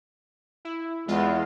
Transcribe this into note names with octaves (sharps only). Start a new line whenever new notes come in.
E4
E2 G#3 F4